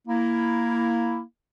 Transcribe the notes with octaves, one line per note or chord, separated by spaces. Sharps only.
A#3 E4